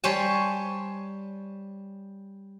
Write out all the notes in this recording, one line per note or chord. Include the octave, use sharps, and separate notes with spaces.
G3 C5 C#5 G#5 A5